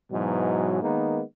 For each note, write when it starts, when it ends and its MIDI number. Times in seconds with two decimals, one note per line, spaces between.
0.12 0.79 44
0.12 0.79 47
0.12 0.79 52
0.12 0.79 54
0.82 1.22 51
0.82 1.22 56
0.82 1.22 58
0.82 1.22 59
0.82 1.22 63